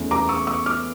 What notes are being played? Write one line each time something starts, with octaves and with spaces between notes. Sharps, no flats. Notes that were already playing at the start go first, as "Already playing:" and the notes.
Already playing: E2 E3 A3 C#4
A#5 D6
C#6 E6
C#6 E6
D6 F6